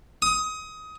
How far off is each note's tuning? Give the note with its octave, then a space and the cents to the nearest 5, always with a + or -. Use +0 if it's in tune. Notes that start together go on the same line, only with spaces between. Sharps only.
D#6 +20